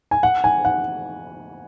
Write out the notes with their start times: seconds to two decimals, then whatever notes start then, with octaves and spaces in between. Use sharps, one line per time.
0.11 G#5
0.23 F#5
0.44 G#5
0.65 F#5